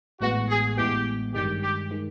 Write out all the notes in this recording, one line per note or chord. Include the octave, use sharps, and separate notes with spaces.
A1 A2 E3 G#3 B3 F#4
G#4
A1 A2 E3 G#3 B3 G4
G2 D#3 G#3 G4
G4
D#3 G#3